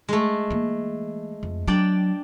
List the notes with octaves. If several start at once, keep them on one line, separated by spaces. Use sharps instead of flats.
G#3 A3
E3 A#3
F2
F#3 D4 D5 G5